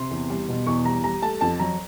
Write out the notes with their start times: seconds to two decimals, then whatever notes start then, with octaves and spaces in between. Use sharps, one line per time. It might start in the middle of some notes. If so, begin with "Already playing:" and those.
Already playing: C3 C6
0.11 E2
0.30 G3
0.49 B2
0.67 E2 C#6
0.85 G3 A#5
1.04 G3 A#5
1.22 A3 A5
1.41 F2 A5
1.60 F#3 A#5